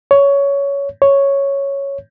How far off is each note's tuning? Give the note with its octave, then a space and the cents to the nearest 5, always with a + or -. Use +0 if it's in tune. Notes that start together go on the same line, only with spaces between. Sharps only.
C#5 +15
C#5 +0